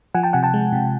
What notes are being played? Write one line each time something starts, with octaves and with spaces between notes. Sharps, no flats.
F3 F#5 G#5
G5 A5
C3 F#5 G#5
G5 A5
G#3
C3